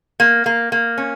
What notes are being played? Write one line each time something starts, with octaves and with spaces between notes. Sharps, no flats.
A#3
A#3
A#3
C#4